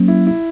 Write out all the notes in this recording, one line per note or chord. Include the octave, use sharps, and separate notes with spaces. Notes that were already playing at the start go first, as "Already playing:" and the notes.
Already playing: F#3 A#3 C#4
E4
E4